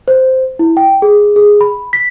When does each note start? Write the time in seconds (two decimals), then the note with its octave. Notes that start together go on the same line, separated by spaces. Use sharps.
0.08 C5
0.59 E4
0.77 G5
1.02 G#4
1.36 G#4
1.61 B5
1.93 B6